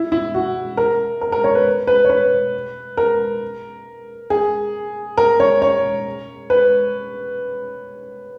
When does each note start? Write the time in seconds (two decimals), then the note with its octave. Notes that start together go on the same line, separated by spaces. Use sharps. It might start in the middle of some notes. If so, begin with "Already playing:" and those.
Already playing: E4
0.12 E4
0.34 F#4
0.77 A#4
1.21 A#4
1.32 A#4
1.44 C#5
1.55 B4
1.87 B4
2.05 C#5
2.10 B4
2.97 A#4
4.30 G#4
5.17 A#4
5.40 C#5
5.62 C#5
6.50 B4